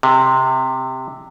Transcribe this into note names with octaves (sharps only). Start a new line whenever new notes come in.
C3